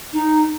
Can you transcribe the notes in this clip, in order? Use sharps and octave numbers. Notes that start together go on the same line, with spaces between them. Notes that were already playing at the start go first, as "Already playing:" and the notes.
D#4